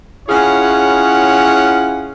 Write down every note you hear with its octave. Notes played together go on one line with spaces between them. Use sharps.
C#4 E4 F4 G#4 C#5 F#5